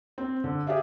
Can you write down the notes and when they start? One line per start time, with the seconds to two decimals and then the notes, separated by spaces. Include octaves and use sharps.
0.18 C4
0.44 D3
0.67 G4 G#4 D5 E5 F5